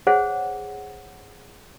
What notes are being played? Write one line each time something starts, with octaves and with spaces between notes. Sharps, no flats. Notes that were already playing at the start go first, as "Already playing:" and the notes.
G#4 C5 C#5 F#5